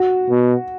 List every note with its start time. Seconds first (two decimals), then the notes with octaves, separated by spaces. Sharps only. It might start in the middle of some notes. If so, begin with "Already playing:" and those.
Already playing: F#4
0.30 B2